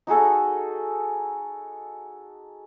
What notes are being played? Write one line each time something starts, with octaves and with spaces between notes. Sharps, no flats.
D#4 F#4 G#4 A4